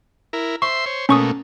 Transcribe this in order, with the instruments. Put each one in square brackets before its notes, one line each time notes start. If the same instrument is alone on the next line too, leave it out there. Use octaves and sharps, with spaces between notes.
[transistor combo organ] E4 A#4
[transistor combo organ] C5 E5 C6 [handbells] C#6
[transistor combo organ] C5 C#5
[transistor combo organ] B2 A3 A#3 [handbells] C#4 C#6 D#6